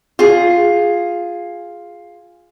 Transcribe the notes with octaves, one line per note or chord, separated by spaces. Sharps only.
F4 G#4